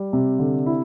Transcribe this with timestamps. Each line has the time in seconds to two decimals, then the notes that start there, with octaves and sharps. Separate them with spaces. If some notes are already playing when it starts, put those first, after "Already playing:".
Already playing: G3
0.13 C3
0.39 D3
0.66 E4